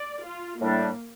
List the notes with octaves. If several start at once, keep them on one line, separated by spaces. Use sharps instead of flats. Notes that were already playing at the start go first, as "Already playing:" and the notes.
Already playing: D5
F4
A2 G3 A#3 D4